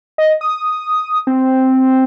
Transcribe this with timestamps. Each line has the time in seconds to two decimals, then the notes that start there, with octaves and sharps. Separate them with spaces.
0.18 D#5
0.41 D#6
1.27 C4